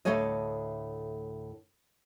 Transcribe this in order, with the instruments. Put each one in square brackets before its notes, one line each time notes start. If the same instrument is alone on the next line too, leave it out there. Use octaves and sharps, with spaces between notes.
[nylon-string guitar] D2 A2 A3 A4 C#5 D#5